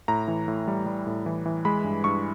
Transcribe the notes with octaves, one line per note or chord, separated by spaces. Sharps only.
A2 A#5
E3
A2
G3
G3
A2
E3
E3
G#3 B5
G2
G2 C#6